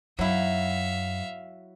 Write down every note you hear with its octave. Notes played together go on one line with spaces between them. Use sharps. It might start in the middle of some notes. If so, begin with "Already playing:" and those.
F#2 F#3 E4 E5 F5